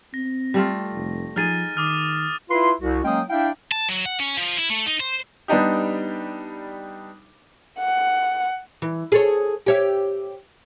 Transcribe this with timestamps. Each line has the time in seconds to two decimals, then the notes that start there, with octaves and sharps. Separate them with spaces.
0.14 C4 A#6
0.54 G3 A3 F4
0.93 F1
1.36 F3 D#4 G#4 F6 A6 D#7
1.77 D#3 D6 D#6 F6
2.50 E4 F4 B4 C6
2.81 C2 F#4
3.04 F#3 G#3 A#3 C#4 G5 D#6
3.30 D4 E4 E5 F5 G5
3.72 A5
3.89 F#3
4.05 F#5
4.20 C#4
4.37 F3
4.58 E4
4.70 A3
4.86 D#4
5.00 C5
5.48 G3 B3 D4 D#4 G4
7.79 F#5
8.82 E3
9.12 G#4 A4 C#5
9.66 G4 C#5 E5